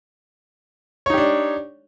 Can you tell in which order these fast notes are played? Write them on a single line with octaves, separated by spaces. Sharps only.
C#5 D#4 G4 D4